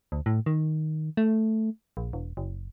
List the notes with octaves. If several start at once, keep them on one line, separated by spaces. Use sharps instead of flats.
D2
A2
D#3
A3
A#1
E1
F#1